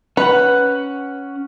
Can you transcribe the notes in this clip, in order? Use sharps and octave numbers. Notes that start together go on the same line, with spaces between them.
C#4 B4 F#5